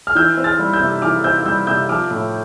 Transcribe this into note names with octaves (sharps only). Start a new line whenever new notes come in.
F6
E3 E6 G6
C4
F6 A6
G3
E6 G6
C3
E3 D6 F6
C4 E6 G6
G3 E6 G6
C3 E6 G6
F3 D6 F6
A2